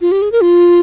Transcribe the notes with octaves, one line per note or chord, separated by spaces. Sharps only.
F4
G4
G#4
A#4
F4